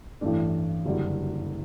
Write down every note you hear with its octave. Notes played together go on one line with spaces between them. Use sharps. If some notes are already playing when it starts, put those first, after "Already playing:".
A1 G2 E3 A3 D4
F#1 F#2 D3 G3